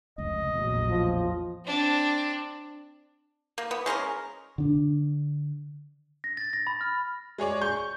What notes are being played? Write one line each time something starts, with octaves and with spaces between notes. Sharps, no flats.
F1 C#2 D#5
A#1 E2 A2 F#3
E2 F3
C4 D4
A#3
B3
G#3 C#4 A4 A#4
D3 D4
A#6
A6
A#6
B5
F6
G#3 G#4 C#5 D5
C#6 G6